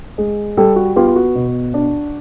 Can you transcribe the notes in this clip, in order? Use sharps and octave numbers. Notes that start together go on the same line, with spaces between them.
G#3
G3 G4 A4
F#4
B3 F4 G4
F4
F#4
B2
D4